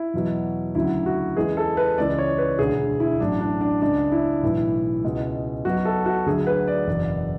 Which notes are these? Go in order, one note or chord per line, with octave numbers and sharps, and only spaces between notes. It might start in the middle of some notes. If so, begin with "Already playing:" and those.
Already playing: E4
E2 B2 F#3
D2 C#3 F#3 E4
F#4
E2 C#3 E3 G#3 G#4
A4
B4
C#2 C#3 E3 G#3 D5
C#5
B4
E1 D2 D3 G#4
E4
A1 A2 F#3 D4
D4
D4
C#2 C#3 G#3 D4
E4
B1 A2 E3
C#2 B2 G#3
B1 B2 F#3 F#4
A4
F#4
D2 D3 F#3 G#4
B4
D5
F#1 E2 B2